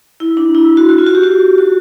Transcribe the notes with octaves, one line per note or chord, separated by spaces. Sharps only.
E4
D4
E4
F#4
F#4
F4
F#4
G4
F#4
F#4